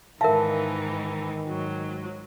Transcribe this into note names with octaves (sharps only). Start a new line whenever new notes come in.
G#2 D#3 E3 D#4 A#4 E5 F5 A5
G#2 F#3